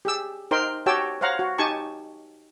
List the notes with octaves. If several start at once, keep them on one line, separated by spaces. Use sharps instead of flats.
G4 G#4 E6
D#4 A#4 C5 G5 C6
F#4 G4 C#5 G5 A5 E6
C5 C#5 F5 F#5 A#5
F#4
D#4 G4 G#5 A5 C#6